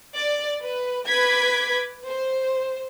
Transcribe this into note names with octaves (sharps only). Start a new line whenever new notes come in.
D5
B4
B4 D6 G#6 B6
C5